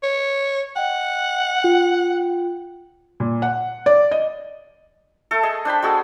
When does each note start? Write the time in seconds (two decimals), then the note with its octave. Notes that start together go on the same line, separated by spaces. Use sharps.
0.03 C#5
0.76 D#5 F#5 G5
1.62 F4 G5
3.20 A#2
3.42 F#5
3.86 D5
4.11 D#5
5.31 A3 A4
5.43 G#4 D#5
5.65 D4 C5 G5 B5
5.82 G#3 F#4 G#4 A4